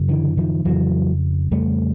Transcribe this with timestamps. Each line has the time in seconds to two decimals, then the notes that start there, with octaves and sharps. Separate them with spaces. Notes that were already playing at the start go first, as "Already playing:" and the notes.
Already playing: F#2 C#3
0.08 D3 E3
0.37 D#3 F3
0.65 F2 C#3 E3 F#3
1.51 F2 C#3 G3 A3